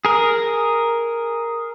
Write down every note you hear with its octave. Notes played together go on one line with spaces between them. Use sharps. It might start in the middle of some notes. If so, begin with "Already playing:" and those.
G#4 A#4